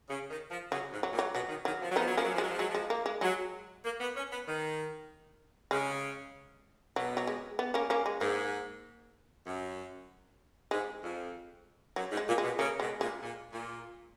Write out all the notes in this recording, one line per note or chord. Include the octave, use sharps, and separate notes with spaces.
C#3
D#3
F3
C#3 F#3
G#2
F#3
A#2
F#3
B2 F#3
D#3
D#3 F#3
F3
F#3
F3 B3 D#4
F#3
F3 A#3 C#4
F#3
F3
F#3 G#3
F3
F#3 G#3
F3
G#3
A#3
G#3
F#3 G#3
A#3
B3
C#4
B3
D#3
C#3 G#3
B2 F#3
F#3
G#3
B3
A#3 C#4
A#3 C#4
G#3
G#2 A#3
F#2
G#2 G#3
F2
F#2 F#3
G#2
G#3
A#2
G#3
B2
C#3 A#3
B2 G#3
A#2 G#3
A#2
A#2